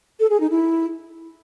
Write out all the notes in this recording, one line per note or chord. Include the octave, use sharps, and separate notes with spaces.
A4
G#4
D#4
E4